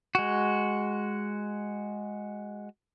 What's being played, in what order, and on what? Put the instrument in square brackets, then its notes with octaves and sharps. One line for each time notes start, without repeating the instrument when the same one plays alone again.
[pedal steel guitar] G#3 F#4